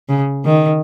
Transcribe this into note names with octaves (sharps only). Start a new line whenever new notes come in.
C#3
D#3